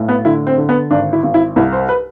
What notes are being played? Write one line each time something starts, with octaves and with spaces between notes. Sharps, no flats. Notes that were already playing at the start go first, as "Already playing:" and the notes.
Already playing: B1 A2
B3
D3 E4
C4
D3
B3
G#1 D4
E4
G#1
E4
C2 E4
C5
B4